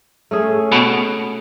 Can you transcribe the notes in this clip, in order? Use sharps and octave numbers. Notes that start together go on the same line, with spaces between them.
A3 C#4 G#4
B2